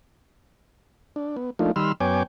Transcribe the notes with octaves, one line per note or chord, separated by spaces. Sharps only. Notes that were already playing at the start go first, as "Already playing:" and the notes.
D4
B3
F3 A3 A#3 D4 D#4 F4
D#3 G3 B5 C6 E6 F6
F#2 B3 C#5 G5 G#5 D6